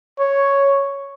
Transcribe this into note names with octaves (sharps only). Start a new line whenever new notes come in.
C#5